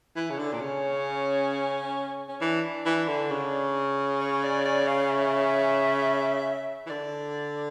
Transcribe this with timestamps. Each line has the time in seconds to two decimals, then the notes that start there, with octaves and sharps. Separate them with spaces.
0.16 E3 E4
0.30 C#3
0.38 D3 D4
0.53 A#2
0.61 C#3 C#4
2.29 C#4
2.41 E3 D4
2.86 E3
3.08 D3
3.31 C#3
4.21 C#5
4.43 D5
4.65 D5
4.88 F5
5.10 E5
6.86 E3
6.90 D3 D5